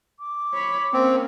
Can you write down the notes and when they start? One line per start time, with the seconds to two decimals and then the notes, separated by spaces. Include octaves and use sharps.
0.19 D6
0.53 C#5 B5
0.93 A#3 C4 C#4